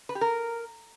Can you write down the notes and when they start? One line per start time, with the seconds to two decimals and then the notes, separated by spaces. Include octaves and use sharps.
0.09 B4
0.15 G4
0.21 A#4